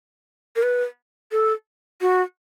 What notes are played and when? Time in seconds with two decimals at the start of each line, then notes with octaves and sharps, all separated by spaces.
0.56 A#4
0.63 B4
1.32 A4
2.01 F#4